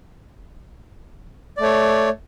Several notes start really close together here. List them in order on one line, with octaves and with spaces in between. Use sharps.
D5 A3 C#5